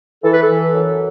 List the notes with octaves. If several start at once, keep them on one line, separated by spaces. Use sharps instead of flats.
E3 A4
B4
A4
E3
F#2